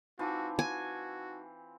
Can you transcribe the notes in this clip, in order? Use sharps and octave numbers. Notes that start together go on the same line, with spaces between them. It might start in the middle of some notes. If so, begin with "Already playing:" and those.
E3 C4 D#4 F4 F#4 A5 D6
F#4 G#5